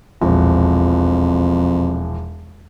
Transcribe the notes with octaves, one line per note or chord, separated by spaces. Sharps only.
E1 A#1 F2